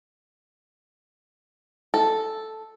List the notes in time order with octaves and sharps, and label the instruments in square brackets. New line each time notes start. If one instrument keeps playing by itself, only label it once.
[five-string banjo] A4